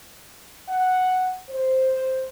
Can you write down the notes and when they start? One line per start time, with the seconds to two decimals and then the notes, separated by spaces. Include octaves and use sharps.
0.68 F#5
1.49 C5